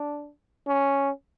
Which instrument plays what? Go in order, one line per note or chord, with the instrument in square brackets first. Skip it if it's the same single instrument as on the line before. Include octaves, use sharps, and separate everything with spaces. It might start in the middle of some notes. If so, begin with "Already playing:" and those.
Already playing: [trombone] D4
C#4